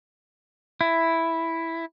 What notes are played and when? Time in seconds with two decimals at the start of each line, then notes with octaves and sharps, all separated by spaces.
0.81 E4